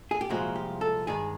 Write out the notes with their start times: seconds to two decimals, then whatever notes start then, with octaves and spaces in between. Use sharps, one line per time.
0.11 G#4
0.21 G4
0.29 C2 A#2 F3 G#3 F#4
0.56 G4
0.81 A4
1.07 G2 D#3 G#3 G#4